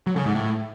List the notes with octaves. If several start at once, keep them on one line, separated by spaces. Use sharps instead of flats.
F#3
C#3
G#2
A2